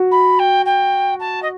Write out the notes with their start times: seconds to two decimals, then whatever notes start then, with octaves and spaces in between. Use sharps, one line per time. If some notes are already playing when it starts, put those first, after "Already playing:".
Already playing: F#4
0.11 B5
0.39 G5
0.65 G5
1.19 A5
1.42 D#5